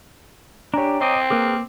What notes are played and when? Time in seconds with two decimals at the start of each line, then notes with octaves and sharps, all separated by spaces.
0.74 D4 G4 C#5 G#5 A#5
1.01 C4 D#5 D6 D#6
1.30 A#3 G#4 A#4 B4 D6